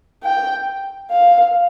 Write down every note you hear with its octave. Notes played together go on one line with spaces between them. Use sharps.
G5
F5